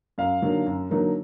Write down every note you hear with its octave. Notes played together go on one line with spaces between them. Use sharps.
F#2 F5
D3 F#3 A#3 D#4
F#2
D3 F#3 A#3 D#4